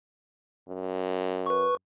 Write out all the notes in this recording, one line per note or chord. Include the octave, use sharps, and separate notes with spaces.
F#2
B4 C#6